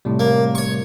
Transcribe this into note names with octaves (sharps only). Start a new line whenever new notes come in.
A2 C3 G3
A#3
C#5 C#6